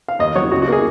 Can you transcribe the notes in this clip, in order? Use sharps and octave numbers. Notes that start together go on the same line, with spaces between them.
F5
D#2 D#5
F#3 C#5
C#2 F#4
F#4
A#3 G#4